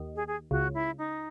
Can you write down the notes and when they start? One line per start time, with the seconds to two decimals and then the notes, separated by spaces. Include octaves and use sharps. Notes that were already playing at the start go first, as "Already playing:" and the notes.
Already playing: D#2 D#3
0.16 G#4
0.28 G#4
0.51 C#2 C#3 F#4
0.74 E4
0.98 D#4